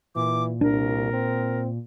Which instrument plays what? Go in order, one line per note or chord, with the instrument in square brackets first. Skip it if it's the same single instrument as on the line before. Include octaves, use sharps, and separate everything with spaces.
[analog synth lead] A#2 [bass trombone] E3 [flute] D6
[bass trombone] C2 [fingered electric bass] D4 [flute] A#4
[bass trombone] C4